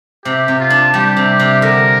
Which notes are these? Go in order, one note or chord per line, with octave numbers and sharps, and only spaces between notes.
C3 G4
C3
F4
D4
G3 G4
C3
C3
D3 A#4